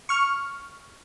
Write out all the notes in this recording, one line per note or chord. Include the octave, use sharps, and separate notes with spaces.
C#6 F6